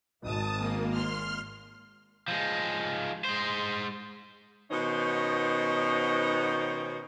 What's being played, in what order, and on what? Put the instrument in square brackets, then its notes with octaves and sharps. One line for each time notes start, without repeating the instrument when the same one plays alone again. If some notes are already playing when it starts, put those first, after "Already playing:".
[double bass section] G#1 [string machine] A5 D#6
[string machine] A#3
C6 F6
[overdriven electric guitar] F3 G#3
G#3 C5
[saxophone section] B2 D#3 B3 C#4 D#4 C5